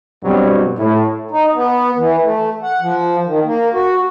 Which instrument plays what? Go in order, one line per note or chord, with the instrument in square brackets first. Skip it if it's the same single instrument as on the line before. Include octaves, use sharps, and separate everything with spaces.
[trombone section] G2 B2 F#3 G3 C4
A2
[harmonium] D#4
B3
E3
A3
F#5
F3
D#3
A#3
F#4